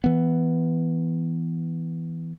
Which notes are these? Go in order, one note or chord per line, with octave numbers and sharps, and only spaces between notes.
E3 B3